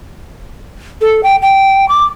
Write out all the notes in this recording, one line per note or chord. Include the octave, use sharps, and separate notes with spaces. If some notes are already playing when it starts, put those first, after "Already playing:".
A4
G5
G5
D6